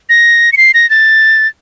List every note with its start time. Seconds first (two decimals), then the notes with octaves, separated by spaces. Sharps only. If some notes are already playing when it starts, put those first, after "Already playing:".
0.09 A#6
0.53 C#7
0.57 C7
0.74 A#6
0.90 A6